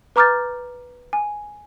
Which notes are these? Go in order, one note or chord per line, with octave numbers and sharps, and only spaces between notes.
B4 A#5 D6 F6 G6 A6
G#5